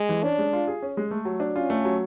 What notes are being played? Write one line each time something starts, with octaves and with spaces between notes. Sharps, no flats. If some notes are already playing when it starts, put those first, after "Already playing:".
Already playing: G#3
E3
C#4 D4
G#3
F4
G#4
C#4
G#3
A3
F#3
D4
C#4 F4
A3
F#3